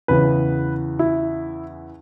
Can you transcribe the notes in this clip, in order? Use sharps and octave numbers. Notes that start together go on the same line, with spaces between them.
E2 C#3 E3 B4
E4